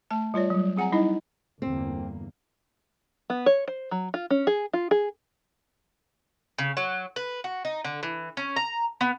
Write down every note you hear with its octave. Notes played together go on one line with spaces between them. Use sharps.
A3 A5
G3 F4 C#5 D5
F#3 G3
C4 G#4 F#5 G#5 A#5
G3 D#4 E4 D#5
G1 E2 A#3 C4
B3
C#5
C5
F#3
F4
C#4
G#4
F4
G#4
C#3
F#3
B4
F#4
D#4
D3
E3
C#4
A#5
B3